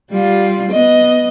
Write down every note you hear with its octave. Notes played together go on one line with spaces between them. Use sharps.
G3 F4
B3 D#5